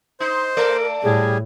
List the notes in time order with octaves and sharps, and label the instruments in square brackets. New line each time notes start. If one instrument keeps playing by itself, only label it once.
[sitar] D#4 [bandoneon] C5 [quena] C6
[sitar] A3 A4 D5 [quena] A#4
[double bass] A2 [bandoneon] G3 [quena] G#4